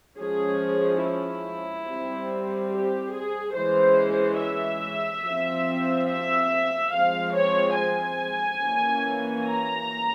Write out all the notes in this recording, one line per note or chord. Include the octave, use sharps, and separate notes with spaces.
F3 G#3 C#4 G#4
E4
G3 C4
G4
G#4
E3 G#3 C#4 C5
E5
F3 C4
E5
F3 G#3 C4 F5
C#5
G#5
E3 A#3 C#4
A#5